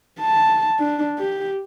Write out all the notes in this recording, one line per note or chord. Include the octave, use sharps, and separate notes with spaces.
A5
D4
G4